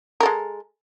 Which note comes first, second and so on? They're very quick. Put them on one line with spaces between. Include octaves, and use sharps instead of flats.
A#4 A4 G#3